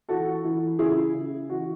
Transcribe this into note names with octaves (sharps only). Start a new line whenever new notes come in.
E3 F#4 A4
E3
C#3 E4 G#4
C#3
E3 F#4